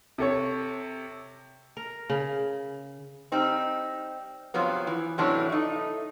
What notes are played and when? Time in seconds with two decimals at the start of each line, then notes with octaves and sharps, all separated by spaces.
0.18 C3 A4 C#5
1.77 A#4
2.10 C#3
3.32 G3 C4 D#4
4.54 G2 C3 F3 F#3 B3
4.87 E3
5.18 A2 C3 E3 F#3 C#4 D4
5.49 A3 D#4